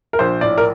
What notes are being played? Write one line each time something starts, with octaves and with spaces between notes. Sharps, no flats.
A#4
A#1 C5
A2 D5
A#4